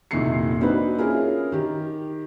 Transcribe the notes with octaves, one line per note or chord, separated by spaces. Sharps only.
F1 A#2 D#3 E4 C7 C#7
A#3 C4 D4 D#4 F#4 B4
C#4 E4 F4 G#4 A#4
D#3 D#4 G4